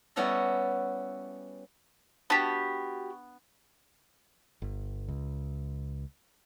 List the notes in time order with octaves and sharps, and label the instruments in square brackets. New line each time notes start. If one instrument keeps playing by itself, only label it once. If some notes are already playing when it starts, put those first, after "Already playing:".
[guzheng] G3 B3 C#4 E4 F#4 A4
[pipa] B3 D4 A5 [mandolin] F#4 G4
[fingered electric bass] G1
C#2